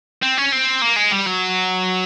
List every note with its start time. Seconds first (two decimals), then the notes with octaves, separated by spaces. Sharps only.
0.22 C4
0.37 C#4
0.52 C4
0.82 A#3
0.96 G#3
1.11 G3
1.26 F#3